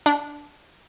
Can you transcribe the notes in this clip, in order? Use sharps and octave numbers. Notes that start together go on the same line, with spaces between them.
D4